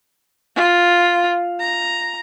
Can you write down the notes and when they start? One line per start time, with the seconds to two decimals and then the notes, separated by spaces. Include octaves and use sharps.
0.56 F4
1.60 A#5